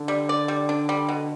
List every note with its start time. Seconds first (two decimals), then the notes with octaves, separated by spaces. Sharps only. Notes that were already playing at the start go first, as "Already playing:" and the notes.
Already playing: D3
0.08 G3
0.29 D5
0.48 G3
0.69 D4
0.89 G3
1.09 B2